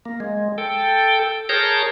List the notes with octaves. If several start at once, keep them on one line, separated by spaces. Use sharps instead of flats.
A#3
G#3
A4 G5
G#4 A#4 C#5 A5 A#5 G6